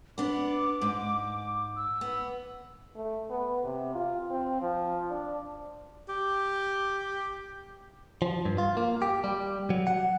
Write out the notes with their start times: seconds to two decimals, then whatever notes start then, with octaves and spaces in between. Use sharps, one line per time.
0.18 B3 D4 D6
0.82 G#2
1.76 E6
2.01 B3
2.95 A3
3.30 B3
3.63 C3
3.95 F4
4.31 C4
4.61 F3
5.10 D4
6.09 G4
8.22 F3
8.45 G2
8.58 F4
8.77 A#3
9.02 G4
9.24 G3
9.70 F#3
9.87 F#5